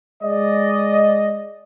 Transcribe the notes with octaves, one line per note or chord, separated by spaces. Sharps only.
G#3 D5 D#5